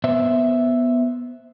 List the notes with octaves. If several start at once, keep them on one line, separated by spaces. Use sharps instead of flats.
B3 C5 E5